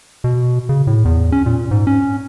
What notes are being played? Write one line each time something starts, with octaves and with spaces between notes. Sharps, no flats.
B2
C#3
A2
E2
C#4
A#2
G#2
C#4